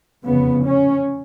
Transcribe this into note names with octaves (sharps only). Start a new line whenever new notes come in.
F1 E2 C#3 B3
C#4